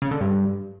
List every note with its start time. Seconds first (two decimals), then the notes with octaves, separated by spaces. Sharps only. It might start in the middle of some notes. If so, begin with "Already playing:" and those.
0.02 C#3
0.11 D3
0.21 G2